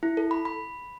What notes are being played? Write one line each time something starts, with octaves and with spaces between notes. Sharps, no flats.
E4
A4
B5
B5